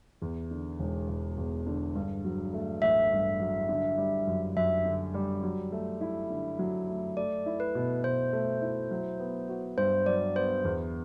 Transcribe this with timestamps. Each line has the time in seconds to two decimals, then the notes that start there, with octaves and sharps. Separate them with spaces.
0.22 E2
0.51 D3
0.79 E1
1.09 E1
1.38 E2
1.67 D3
1.95 G2
2.24 F#3
2.53 A3
2.82 A1 E5
3.12 G2
3.40 F#3
3.69 D3
3.98 G3
4.27 F#2
4.57 F#2 E5
4.85 D3
5.14 G3
5.43 F#3
5.72 A3
6.01 E4
6.30 D3
6.59 F#3
6.88 A3
7.16 A3 D5
7.46 E4
7.60 B4
7.75 B2
8.03 B2 C5
8.33 A3
8.62 E4
8.91 F#3
9.20 B3
9.49 F#4
9.78 G2 C5
10.06 F#3 D5
10.35 B3 C5
10.64 E2